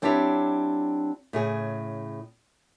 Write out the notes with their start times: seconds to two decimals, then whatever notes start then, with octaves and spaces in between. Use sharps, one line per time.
0.02 F#3 C4 D4 E4 G4 C#5
1.33 A2 C#3 G#4